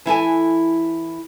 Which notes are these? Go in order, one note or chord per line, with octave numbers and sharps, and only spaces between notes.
E3 E4 A4 G#5